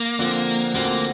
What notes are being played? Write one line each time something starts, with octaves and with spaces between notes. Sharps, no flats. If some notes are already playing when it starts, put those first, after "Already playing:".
Already playing: A#3
D3 F3 C4
D2 D3 F3 A#3 C4